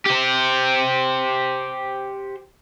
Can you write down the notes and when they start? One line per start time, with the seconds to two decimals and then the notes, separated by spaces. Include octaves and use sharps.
0.06 G4 C5